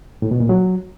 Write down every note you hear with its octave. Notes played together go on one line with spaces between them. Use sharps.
A2
B2
A#2
F#3